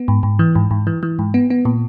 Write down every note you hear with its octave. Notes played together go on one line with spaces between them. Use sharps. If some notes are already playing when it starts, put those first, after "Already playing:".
Already playing: B3
G#2
G#2
E3
G#2
G#2
E3
E3
G#2
B3
B3
A#2